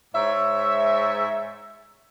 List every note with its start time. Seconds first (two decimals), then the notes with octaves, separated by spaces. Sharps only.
0.13 G#2 C#5 E5